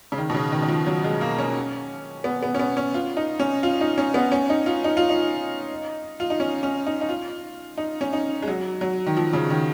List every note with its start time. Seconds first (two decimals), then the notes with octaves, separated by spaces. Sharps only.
0.12 C#3
0.18 D#3
0.30 B2
0.34 C#3
0.52 D#3
0.62 D#3
0.68 F3
0.86 F#3
1.04 G#3
1.21 A#3
1.38 C#4
2.24 B3
2.43 B3
2.55 C#4
2.59 B3
2.77 C#4
2.94 F4
3.17 D#4
3.39 C#4
3.63 F4
3.81 D#4
3.98 C#4
4.14 B3
4.32 C#4
4.50 D#4
4.66 F4
4.84 D#4
4.97 F4
5.09 D#4
6.20 F4
6.30 D#4
6.40 C#4
6.63 C#4
6.86 D#4
7.01 D#4
7.09 F4
7.77 D#4
8.01 C#4
8.13 D#4
8.42 G#3
8.48 F#3
8.81 F#3
9.07 D#3
9.17 F3
9.33 C#3
9.50 D#3